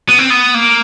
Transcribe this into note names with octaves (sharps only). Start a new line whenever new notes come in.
B3
C4
B3
A#3